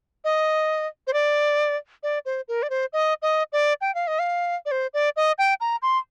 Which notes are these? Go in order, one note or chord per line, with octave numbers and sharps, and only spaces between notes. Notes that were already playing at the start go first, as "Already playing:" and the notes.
D#5
C5
D5
D5
C5
A#4
D5
C5
D#5
D#5
D5
G5
F5
D#5
F5
D5
C5
D5
D#5
G5
A#5
C6